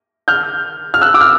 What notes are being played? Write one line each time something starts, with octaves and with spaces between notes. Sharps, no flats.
F6 G6
F6
E6 F#6
D6 E6
F6